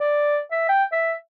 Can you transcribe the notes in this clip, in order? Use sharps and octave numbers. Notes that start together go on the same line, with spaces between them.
D5
E5
G5
E5